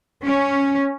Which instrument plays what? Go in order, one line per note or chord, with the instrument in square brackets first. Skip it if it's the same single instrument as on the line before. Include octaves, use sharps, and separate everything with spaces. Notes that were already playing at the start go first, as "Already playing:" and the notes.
[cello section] C#4